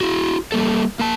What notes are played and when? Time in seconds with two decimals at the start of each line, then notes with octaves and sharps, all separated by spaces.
0.01 E4 F#4
0.52 G3 A#3 A4
0.99 A#3 A5